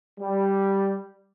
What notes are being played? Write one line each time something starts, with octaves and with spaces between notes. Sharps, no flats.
G3